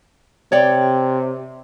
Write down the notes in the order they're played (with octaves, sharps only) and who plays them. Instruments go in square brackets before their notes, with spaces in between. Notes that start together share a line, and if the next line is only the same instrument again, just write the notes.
[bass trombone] C3 [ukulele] C#5 D5 G5